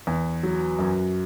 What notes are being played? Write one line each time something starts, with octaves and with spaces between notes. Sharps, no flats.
E2
F#3
F#2